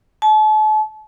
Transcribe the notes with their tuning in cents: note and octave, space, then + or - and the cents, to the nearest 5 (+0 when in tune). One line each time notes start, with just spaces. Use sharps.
A5 -40